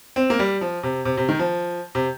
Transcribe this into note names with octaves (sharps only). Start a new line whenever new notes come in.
C4
A#3
G3
F3
C3
C3
C3
D#3
F3
C3